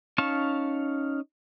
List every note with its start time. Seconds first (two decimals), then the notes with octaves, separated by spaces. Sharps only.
0.18 C#4 D#4 F5 A5 C#6